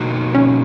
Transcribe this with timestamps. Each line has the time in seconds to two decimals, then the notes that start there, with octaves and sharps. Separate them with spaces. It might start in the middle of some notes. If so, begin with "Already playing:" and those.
Already playing: B2 A#3 D#4 F#4
0.35 C#4